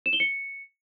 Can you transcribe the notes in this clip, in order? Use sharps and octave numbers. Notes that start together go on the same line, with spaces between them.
E7
G7
C#7